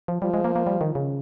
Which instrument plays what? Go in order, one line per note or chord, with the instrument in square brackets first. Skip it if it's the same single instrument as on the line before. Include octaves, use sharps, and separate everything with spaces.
[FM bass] F3
[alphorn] F3 [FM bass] G3
[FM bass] G#3
A#3
A#3
G3
D#3
C#3